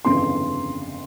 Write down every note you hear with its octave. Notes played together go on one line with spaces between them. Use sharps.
G1 F2 C#3 E3 C6